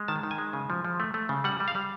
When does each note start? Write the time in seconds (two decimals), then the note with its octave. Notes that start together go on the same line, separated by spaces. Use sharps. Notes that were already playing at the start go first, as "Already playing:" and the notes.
Already playing: G#3
0.08 D#3 A5
0.23 D#3
0.31 G#5
0.38 G#3
0.53 C#3
0.70 F3
0.85 F3
1.00 A3
1.14 A3
1.29 C#3
1.44 G3 F#5
1.60 G3
1.68 F5
1.75 G3